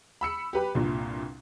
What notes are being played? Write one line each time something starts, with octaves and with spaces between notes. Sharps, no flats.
B5 E6 C#7
G4 B4 B5
C2 G2 A#2